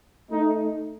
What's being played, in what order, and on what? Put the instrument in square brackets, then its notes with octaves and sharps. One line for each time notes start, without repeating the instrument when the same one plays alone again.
[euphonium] A3 [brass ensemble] D#4